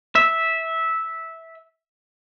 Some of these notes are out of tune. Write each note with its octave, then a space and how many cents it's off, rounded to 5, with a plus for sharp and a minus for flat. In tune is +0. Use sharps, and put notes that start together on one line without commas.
E5 -10